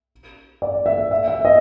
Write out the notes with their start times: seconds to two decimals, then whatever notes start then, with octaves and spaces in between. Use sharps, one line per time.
0.62 D5
0.86 E5
1.11 E5
1.28 E5
1.45 D#5